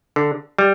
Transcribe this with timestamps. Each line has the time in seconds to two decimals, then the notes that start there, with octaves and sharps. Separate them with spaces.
0.16 D3
0.59 G3